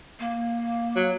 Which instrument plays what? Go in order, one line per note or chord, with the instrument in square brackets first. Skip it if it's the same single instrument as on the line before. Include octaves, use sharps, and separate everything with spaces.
[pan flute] A#3
[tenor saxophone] F#3